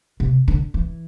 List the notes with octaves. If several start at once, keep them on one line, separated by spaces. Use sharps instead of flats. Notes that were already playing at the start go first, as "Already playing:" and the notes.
C3
D3
E3